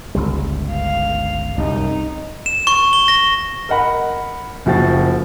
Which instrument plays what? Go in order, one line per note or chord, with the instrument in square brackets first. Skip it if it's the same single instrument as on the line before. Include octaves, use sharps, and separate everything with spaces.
[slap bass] G1 C#2 G3
[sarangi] F5
[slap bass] C2 F#2 [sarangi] D#4
[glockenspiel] E7
C#6
G7
A#6
[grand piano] A#4 D#5 F#5 B5
F#1 F3 F#4 G5 A6